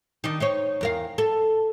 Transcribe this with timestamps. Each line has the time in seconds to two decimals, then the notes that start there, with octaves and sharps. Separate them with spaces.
0.24 D#3 D4 D#4
0.40 D#4 C5 C#5
0.81 E2 A#4 F5
1.18 A4